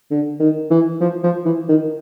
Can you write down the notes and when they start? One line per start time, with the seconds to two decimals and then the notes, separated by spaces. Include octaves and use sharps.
0.11 D3
0.40 D#3
0.70 E3
1.01 F3
1.24 F3
1.45 E3
1.69 D#3